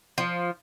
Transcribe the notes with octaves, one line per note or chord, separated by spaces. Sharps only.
F3